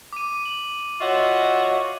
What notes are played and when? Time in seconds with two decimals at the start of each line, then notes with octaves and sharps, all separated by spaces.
0.13 D6 D#7
0.45 F#7
1.01 F4 F#4 C#5 D#5 E5 E6